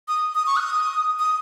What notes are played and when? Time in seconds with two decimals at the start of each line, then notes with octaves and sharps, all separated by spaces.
0.08 D#6
0.35 D#6
0.47 C#6
0.56 F#6
0.60 D#6
1.19 D#6